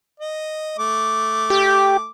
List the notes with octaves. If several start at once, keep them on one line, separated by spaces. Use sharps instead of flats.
D#5
A3 D6
G4